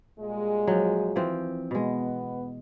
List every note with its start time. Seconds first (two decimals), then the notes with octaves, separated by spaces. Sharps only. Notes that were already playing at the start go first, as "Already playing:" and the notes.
0.19 A#2 G3 G#3
0.67 F3 F#3
1.16 E3 F3 C4
1.71 B2 G#3 B3